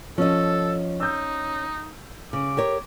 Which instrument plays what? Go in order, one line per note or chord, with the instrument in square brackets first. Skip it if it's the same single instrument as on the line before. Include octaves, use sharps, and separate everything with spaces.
[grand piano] F3 [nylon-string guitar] C#4 D#5 [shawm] A4
[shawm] D#4 [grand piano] E6 G6
[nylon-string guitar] C#3 [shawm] D6
[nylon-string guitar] G4 A#4 C#5